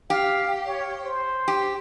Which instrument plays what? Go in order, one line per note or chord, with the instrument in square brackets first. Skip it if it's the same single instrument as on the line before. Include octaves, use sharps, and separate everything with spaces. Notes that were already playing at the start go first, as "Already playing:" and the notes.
[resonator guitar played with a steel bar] G4 [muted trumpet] F5
[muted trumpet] C#5
C5
[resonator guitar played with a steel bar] G4